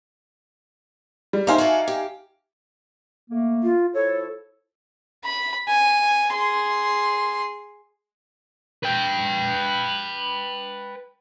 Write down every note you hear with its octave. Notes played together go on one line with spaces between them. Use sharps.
G3
D#4 G4 C5 E5 F5 G#5
F#4 A4 D5
G4
A3 A#3
F4
F3 E4 A4 C#5
B5
G#5
G#4 C6
B4 G5